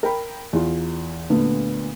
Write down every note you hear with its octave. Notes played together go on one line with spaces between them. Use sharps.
A#4 G5 B5
E2 F4
D2 A#2 D3 B3